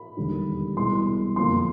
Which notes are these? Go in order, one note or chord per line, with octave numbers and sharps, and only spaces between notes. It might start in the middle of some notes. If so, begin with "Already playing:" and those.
Already playing: B5
E1 D#2 D3 G3
C2 B2 G#3 C6
F#1 F2 D3 F3 A#3 C6